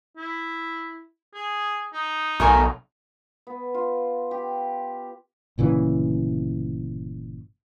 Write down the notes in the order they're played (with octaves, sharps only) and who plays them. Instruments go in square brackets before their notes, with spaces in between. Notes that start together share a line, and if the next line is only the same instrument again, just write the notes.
[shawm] E4
G#4
D#4
[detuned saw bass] B1 [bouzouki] A3 A#4 G#5
[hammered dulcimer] B3
F4
G4
[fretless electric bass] G1 A#2 C#3 E3